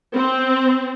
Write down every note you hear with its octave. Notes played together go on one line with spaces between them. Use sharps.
C4